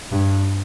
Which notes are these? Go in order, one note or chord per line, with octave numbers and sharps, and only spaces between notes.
G2